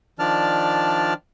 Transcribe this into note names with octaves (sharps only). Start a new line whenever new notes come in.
D#3 F3 D4 D5 A5 F6